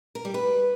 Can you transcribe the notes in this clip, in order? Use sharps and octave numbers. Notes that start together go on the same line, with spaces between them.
A#4
G3
B4